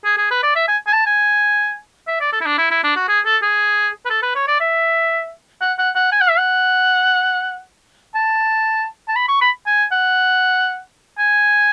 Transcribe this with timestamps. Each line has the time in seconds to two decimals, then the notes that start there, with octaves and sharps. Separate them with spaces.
0.05 G#4
0.18 G#4
0.31 B4
0.43 D5
0.56 E5
0.68 G#5
0.87 G#5
0.93 A5
1.06 G#5
2.07 E5
2.21 D5
2.33 A4
2.41 E4
2.46 D4
2.58 E4
2.71 E4
2.84 D4
2.96 F#4
3.08 G#4
3.25 A4
3.42 G#4
4.05 B4
4.10 A4
4.23 B4
4.35 C#5
4.48 D5
4.60 E5
5.62 F#5
5.79 F#5
5.95 F#5
6.12 G#5
6.21 F#5
6.30 E5
6.38 F#5
8.15 A5
9.08 A5
9.16 B5
9.28 C#6
9.41 B5
9.67 G#5
9.92 F#5
11.18 G#5